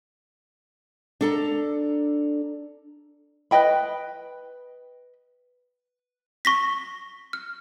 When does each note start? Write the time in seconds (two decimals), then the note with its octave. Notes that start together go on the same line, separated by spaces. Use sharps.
1.21 D4 A4 A#5
3.51 B4 D#5 G5 B5
6.45 C#6 A#6 B6
7.33 F6